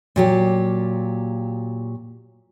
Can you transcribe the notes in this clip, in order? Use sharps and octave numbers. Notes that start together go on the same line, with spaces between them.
A#2 F#3 G4